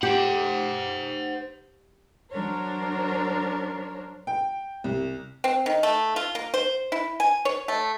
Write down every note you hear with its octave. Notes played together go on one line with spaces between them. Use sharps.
G4 C5 F#5
F#3 D4 A#4 C5 C#5
G5
C2
C4
D#3
A3
F4
A#3
C5
E4
G#5
C#5
A3